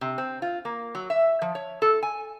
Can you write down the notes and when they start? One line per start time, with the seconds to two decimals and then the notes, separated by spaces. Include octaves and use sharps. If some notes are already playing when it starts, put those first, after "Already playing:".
0.01 C3
0.18 C4
0.42 F4
0.65 A#3
0.95 F#3
1.10 E5
1.42 F3
1.55 C#5
1.82 A4
2.03 G#5